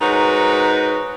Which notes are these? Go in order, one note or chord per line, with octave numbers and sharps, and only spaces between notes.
G#2 D#4 F#4 A#4 B4 C#5